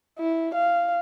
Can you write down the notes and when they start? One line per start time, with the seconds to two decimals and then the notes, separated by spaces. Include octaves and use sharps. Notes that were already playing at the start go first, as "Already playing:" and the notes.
0.19 E4
0.55 F5